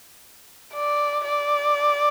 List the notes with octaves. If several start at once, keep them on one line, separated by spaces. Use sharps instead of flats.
D5
D5